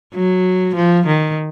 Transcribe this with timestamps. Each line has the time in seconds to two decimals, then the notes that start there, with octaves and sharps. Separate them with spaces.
0.14 F#3
0.76 F3
1.07 D#3